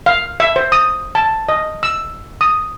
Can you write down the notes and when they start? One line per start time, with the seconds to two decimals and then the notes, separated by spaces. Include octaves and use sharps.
0.06 F5
0.40 E5
0.56 C5
0.72 D#6
1.15 A5
1.49 D#5
1.83 E6
2.41 D#6